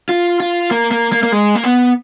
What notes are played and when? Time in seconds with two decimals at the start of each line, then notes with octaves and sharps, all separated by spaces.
0.09 F4
0.40 F4
0.71 A#3
0.91 A#3
1.12 A#3
1.23 A#3
1.32 G#3
1.55 A#3
1.64 B3